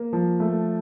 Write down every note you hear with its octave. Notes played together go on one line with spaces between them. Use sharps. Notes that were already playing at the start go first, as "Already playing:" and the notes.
Already playing: A#3
F3
A3